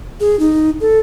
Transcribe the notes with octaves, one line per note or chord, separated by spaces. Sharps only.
G#4
D#4
A4